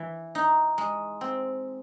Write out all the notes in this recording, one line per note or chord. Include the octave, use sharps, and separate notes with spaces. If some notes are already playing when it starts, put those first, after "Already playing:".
Already playing: E3
D#4
G#3
C4